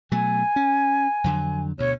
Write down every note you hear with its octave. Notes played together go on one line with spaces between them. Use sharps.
B2 F#3 A3 G#5
C#4
F2 D3 F#3
D2 B2 C#5